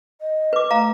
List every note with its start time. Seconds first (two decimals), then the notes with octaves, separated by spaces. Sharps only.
0.21 D#5
0.53 B4 D6
0.71 A3 F5 A#5